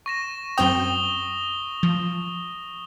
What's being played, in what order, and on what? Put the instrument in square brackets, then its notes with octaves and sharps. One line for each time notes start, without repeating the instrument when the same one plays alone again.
[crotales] C#6 A#6 E7
[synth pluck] F#2 C4 G5 [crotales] D#6 G7
[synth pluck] F3